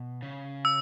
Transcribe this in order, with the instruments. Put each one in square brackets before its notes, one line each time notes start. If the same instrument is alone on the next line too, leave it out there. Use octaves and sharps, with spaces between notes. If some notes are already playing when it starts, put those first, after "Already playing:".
Already playing: [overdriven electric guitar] B2
C#3
[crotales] E6